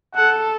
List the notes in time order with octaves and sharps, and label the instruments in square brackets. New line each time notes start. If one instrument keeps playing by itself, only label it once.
[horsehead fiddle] A4 [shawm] F#5